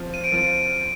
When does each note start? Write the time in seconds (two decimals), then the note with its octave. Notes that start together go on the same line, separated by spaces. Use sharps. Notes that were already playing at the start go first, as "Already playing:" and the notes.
Already playing: F3 C4 F4
0.14 D#7
0.24 D7
0.32 F3 C4 F4 D#7